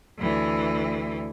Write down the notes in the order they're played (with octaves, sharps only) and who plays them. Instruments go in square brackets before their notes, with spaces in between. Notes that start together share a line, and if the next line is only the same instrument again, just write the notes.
[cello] D2 E3